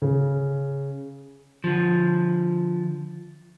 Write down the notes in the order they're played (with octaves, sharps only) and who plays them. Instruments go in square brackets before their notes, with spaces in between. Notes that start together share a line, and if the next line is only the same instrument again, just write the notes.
[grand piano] C#3
[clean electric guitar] D3 F3